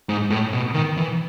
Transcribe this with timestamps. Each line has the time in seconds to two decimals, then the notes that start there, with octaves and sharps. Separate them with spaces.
0.09 G#2
0.30 A2
0.53 B2
0.74 D#3
0.97 E3